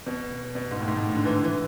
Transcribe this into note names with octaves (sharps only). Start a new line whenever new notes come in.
B2
B2
G#2
A2
G#2
A2
D3
E3
D3
E3